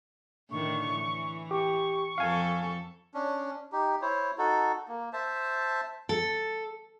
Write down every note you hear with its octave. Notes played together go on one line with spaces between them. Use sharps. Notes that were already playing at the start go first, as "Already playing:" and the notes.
A2 D3 D#3 C#6
E3
G4 C#6
F2 A4 F5 G#5
C#4 D4
D#4 G4
E4 C5 C#5
D#4 F#4 A4
A#3
C5 E5 A5
A4